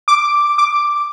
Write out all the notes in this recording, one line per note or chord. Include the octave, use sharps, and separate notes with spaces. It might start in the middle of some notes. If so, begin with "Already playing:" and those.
D6
D6